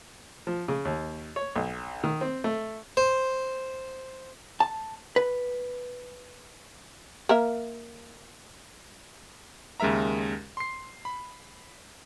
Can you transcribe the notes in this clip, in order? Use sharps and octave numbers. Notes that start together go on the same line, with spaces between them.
F3
C#3
D#2
C#5
B1
D#3
C4
A3
C5
A5
B4
A#3 A#4 E5
D#2 C#3 G#3 A#4 E5 A#5
C6 C7
B5